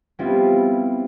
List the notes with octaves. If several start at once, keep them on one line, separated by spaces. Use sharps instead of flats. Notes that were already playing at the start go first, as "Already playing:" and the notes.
G3 B3 C4 E4 F4